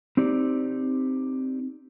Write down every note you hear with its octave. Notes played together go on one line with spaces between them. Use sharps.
C4 D#4 G4 D5